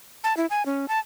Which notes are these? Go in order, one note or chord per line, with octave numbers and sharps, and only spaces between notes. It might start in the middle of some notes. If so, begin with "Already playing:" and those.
A5
E4
G#5
C#4
A5